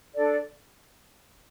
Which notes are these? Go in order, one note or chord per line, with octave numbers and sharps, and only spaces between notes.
D4 A4 D5